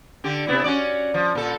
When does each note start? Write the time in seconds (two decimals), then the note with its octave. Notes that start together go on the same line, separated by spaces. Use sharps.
0.24 D3 G4
0.47 C3 B3 E4
0.64 C#4 F#4 D5
1.14 F3
1.35 A#2 A4